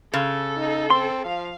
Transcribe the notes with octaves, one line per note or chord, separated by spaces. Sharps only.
C#3 A4
D#4
C4 C6
F3 F5